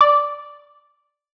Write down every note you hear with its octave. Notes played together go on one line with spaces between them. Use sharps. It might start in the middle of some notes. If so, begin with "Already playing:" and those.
D5